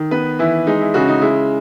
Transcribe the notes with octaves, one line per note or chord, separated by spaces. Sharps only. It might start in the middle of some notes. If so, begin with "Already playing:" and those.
Already playing: D#3
B3 B4
E3 E4
G#3 D#4
E4
C#3 F#4
D#4
G#3 E4